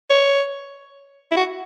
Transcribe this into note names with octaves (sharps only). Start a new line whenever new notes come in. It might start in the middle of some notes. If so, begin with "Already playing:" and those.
C#5
E4
F#4